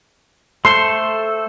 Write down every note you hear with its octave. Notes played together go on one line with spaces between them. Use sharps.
A3 A4 C5 C6